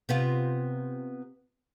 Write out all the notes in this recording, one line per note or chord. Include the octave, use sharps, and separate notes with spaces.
C3 B3 F4